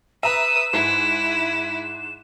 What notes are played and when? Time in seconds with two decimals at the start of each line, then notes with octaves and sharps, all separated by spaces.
0.23 B4 E5 A#5 D#6 E7
0.73 G#2 E4